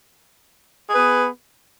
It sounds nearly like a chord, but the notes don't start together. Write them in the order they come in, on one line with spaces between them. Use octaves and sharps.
G#4 B4 B3